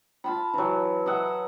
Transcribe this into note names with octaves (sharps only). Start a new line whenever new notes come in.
F4 A5 B5
E3 F#3
D#5 E5 F#5